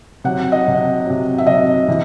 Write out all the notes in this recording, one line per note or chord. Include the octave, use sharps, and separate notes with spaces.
C3 F#3 F#5
D#5
C3 F#3
C3 F#3
E5
C3 F#3 D#5
C3 E3